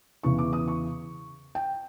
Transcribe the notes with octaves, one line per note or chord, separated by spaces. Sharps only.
E2 C#3 E3 C#6
D6
D#6
C#6
G5